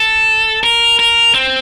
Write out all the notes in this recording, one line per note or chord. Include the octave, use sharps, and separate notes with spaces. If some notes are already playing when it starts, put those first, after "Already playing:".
Already playing: A4
A#4
A#4
C4